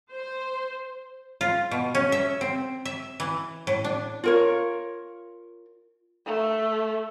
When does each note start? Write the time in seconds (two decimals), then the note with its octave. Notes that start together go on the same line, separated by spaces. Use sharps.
0.12 C5
1.41 F4
1.71 B2
1.95 C#4
2.12 E5
2.41 C4
2.85 E5
3.20 E3
3.67 A2
3.84 D4
4.24 F4 A#4 C#5
6.26 A3